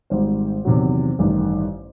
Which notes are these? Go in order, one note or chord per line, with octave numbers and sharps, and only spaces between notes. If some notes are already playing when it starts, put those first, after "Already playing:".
G#1 G#2 D#3 G3 C5
E2 C3 D#3 F#3
A1 G2 D#3